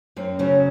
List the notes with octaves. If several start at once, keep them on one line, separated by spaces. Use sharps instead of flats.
F#2 C4
C#3 F#3 C#4